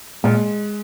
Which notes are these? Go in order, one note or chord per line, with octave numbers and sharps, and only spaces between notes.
A#2 G#3